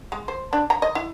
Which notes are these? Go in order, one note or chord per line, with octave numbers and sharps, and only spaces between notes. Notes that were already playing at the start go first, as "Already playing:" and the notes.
G#3
C5
D4
A#5
D#5
E4